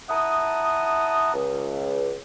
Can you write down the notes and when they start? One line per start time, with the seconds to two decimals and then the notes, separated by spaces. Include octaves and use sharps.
0.09 E4 F#5 A5 A#5 D#6
1.34 C#2